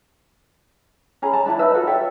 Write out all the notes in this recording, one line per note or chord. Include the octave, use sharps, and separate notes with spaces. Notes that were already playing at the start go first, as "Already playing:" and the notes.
C#4 G#4 A#5 B5
A5 A#5
D4 E4 A5
D#4 B4 E5
F4 F#4 A4
A4 C#5 E5 G5